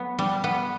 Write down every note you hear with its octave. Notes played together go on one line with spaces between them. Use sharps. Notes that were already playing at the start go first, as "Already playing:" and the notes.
Already playing: F#3 B3
G3
B3